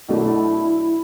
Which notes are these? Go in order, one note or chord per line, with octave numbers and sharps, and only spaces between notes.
B1 B2 F#3 A3 D4 E4